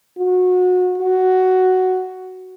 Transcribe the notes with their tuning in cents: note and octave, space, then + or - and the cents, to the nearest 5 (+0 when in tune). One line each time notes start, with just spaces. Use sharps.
F#4 -25
F#4 +5